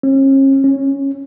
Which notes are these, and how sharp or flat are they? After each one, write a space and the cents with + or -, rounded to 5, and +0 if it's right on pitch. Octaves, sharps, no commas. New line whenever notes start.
C#4 -40
C#4 -5